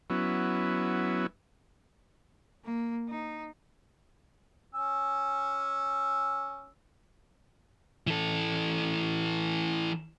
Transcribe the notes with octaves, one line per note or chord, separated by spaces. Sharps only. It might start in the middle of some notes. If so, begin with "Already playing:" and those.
F#3 B3 C#4 E4
A#3
D#4
C#4 G#5 E6
E3 A4